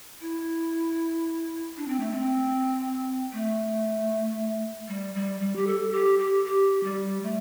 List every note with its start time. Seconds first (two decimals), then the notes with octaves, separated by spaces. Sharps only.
0.21 E4
1.77 D4
1.88 C4
2.00 A3
2.11 C4
3.33 A3
4.88 G3
5.15 G3
5.40 G3
5.56 G4
5.67 A4
5.93 G4
6.19 G4
6.45 G4
6.84 G3
7.23 A3